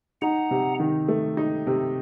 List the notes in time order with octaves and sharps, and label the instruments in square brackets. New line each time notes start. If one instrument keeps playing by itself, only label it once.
[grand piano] D#4 [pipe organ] F#5 A#5
[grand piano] C3
D#3
A3
D#4
C3